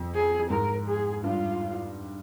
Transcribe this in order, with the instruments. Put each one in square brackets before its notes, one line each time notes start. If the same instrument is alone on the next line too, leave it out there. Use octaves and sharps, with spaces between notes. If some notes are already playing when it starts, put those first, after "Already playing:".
Already playing: [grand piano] F2
[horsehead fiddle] G#4
[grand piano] G#2 [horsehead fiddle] A#4
[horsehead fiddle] G#4
[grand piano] G2 [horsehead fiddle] F4